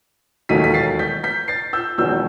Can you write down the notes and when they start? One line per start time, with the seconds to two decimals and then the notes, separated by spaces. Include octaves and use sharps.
0.49 E1 D#2 D#3 F#3 A3 B6 D#7
0.64 B6
0.74 A6 C7
0.99 G6 B6
1.24 G6 B6
1.48 A6 C7
1.73 E6 G6
1.98 E1 E2 D#3 F#3 E6 G6